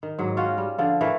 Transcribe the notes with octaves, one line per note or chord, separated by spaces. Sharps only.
D#3
G#2 F#3
C#4 F4 F#4
G3
D3 F3 F4
E3 A3 A#4